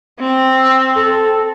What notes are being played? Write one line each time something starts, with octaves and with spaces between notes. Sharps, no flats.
C4
E6
A4